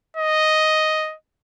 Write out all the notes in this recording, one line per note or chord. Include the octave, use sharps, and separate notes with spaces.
D#5